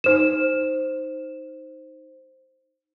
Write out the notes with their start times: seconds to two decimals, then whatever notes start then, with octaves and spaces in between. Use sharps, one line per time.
0.04 D#4 C5 E7